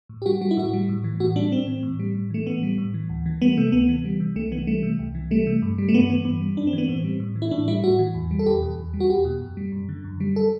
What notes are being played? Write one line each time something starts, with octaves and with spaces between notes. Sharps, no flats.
A2
G4
G3 F#4
G3 F#4
E4
A2 F#4
G3
A2
E3
A2 F#4
G3 D4
A2 C4
E3
A2
G3
A2
E3 A3
A2 B3
G3
A2
E3
D2
E3
G3 B3
C3 A3
D2 B3
E3
G3
C3
C2 A3
E3 B3
G3 A3
C3
C2
E3
G3 A3
C3
G2
G3
A3
G2 B3
E3 B3
G2 B3
G3
G2 D4
C4
E3
B3
A2 C4
G3
A2
E3
E4
A2 D4
G3 E4
A2 F#4
E3
E2
G3
A4
E2 G4
B2
E2
G3
F#4
E2 G4
B2
F#2
G3
F#2
D3
F#2
G3
A4